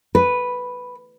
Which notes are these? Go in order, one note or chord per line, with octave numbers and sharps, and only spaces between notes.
B4